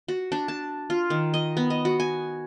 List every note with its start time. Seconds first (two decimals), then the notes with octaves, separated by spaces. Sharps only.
0.08 F#4
0.32 D4
0.48 A5
0.90 F4
1.10 D#3
1.34 D#5
1.57 B3
1.70 D#5
1.85 F#4
2.00 G#5